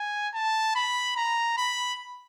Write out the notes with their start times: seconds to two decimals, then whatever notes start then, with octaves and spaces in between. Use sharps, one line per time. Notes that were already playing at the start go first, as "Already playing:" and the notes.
Already playing: G#5
0.34 A5
0.75 B5
1.17 A#5
1.58 B5